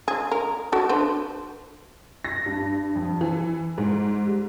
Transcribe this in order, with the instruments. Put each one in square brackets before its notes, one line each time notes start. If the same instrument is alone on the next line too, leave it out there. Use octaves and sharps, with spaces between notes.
[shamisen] G#4
A#4
F#4 A4
D4 B4 C5
[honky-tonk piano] A#6
G2
F2
E3
G#2
G3